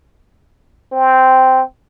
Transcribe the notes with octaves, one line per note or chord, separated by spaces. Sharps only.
C4